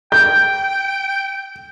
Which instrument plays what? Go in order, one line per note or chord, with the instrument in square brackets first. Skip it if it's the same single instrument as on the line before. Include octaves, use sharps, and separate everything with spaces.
[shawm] G5 [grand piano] G6